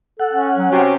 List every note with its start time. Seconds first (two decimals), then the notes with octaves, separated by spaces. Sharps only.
0.20 A4 F#5
0.33 C#4
0.58 F#3
0.72 C3 F#4 G4